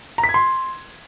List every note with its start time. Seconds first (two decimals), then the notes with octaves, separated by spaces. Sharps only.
0.18 A#5
0.24 B6
0.29 G#6
0.34 C6